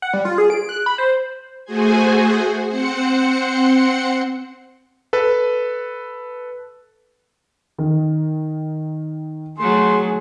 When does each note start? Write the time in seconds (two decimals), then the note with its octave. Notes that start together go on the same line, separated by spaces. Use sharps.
0.02 F#5
0.14 G3
0.25 F4
0.38 G#4
0.50 D7
0.69 F#6
0.86 B5
0.98 C5
1.65 A3 F#4 G#4 C5 G#5
2.68 C4 C5 F#5 C#7
5.13 A4 B4
7.78 D#3
9.59 F#3 A3 G#4 C6